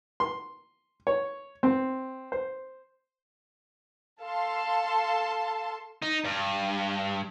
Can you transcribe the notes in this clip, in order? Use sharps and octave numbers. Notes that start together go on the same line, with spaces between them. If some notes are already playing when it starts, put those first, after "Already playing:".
C6
C#5
C4
C5
A4 F5 A5 C6
D#4
G2